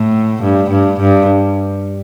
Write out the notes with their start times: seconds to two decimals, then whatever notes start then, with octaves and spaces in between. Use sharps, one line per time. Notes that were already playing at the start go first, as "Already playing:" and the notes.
Already playing: A2
0.42 G2
0.71 G2
1.00 G2